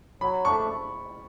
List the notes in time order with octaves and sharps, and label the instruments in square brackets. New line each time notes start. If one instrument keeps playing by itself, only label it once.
[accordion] F#3 [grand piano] B5
[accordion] A3 D4 [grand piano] C#6